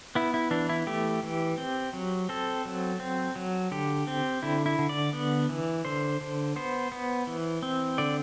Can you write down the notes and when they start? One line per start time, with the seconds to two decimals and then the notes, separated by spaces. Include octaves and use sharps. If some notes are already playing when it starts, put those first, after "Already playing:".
0.15 B3 E4
0.34 E4
0.51 E3 D4
0.69 E4
0.87 A3 G4
1.23 E3
1.58 C4
1.93 F#3
2.29 C4 A4
2.65 F#3
3.00 C4
3.36 F#3
3.71 D3 G4
4.07 C4
4.43 D3 E4
4.66 E4
4.79 D3
4.89 D5
5.13 B3
5.49 E3
5.85 D3 C5
6.21 D3
6.56 B3 C5
6.92 B3
7.27 E3
7.63 C4
7.98 D3 D5